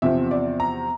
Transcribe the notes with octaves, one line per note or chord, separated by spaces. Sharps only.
E2 C3 F3 C4 E5
D5
A#5